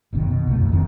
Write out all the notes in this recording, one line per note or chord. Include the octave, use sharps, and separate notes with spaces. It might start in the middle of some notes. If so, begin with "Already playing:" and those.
F#1 B1 B2 D#3
B2
C2 F#3 A3
F2 G#2
D#1 D2 D#3 C4